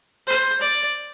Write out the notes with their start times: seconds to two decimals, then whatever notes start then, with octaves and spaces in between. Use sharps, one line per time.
0.27 C5
0.61 D5